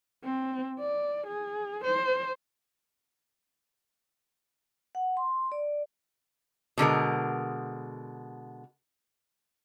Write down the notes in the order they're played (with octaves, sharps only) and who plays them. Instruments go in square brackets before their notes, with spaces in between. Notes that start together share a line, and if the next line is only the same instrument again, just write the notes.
[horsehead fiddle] C4
D5
G#4
C5
[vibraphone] F#5
C6
D5
[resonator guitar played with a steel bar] B2 D3 G#3 A#4